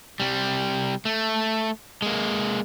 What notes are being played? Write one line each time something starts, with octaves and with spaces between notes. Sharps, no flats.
C3 G3
A3
G#3 A#3